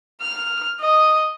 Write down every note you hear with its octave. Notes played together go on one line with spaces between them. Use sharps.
F6
D#5